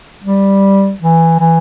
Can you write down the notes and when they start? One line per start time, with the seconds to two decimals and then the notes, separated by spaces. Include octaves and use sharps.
0.24 G3
1.01 E3
1.39 E3